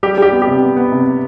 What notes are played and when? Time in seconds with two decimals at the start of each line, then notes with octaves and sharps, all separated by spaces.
0.03 G3 G4
0.18 G3 G4
0.32 B3
0.42 G4
0.47 C3
0.62 B3
0.76 B3
0.92 C3